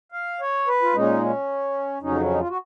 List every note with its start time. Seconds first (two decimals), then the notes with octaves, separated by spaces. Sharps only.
0.12 F5
0.40 C#5
0.67 B4
0.82 F4
0.93 A#2 G#3 C#4 D#4
1.22 C#4
2.02 F2 C#3 F#3 C#4 D#4
2.21 C#4
2.30 D#4
2.39 F4
2.49 F#4